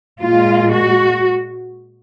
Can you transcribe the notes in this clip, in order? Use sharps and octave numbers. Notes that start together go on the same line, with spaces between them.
A#2 G#3 F4
F#4